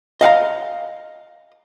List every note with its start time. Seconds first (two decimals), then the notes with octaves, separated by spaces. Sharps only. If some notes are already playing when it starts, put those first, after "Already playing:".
0.21 D#5 F5 F#5 A#5